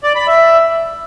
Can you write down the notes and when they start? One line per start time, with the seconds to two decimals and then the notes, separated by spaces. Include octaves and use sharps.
0.04 D5
0.16 B5
0.28 E5